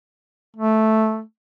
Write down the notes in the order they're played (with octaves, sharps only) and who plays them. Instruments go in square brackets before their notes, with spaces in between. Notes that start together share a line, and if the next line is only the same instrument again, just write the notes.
[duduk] A3